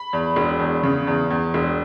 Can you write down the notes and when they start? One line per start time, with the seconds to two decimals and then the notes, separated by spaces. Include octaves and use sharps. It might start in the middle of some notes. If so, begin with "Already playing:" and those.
Already playing: B5
0.13 E2
0.36 E1
0.59 E2
0.83 C#3
1.07 E2
1.30 E2
1.54 E1